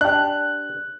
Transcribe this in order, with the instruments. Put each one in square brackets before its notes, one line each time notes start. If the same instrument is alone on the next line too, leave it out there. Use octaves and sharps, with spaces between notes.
[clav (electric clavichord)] D4 G4 [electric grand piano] F#6